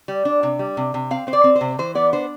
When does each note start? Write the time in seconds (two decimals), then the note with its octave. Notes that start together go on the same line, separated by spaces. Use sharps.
0.08 G3
0.25 D4
0.43 C3
0.59 G3
0.77 C3
0.94 C3
1.11 C4 F5
1.27 C4 C5
1.33 D5
1.44 C4
1.55 C5
1.61 C3
1.79 E3 C5
1.95 B3 D5
2.13 D4 C5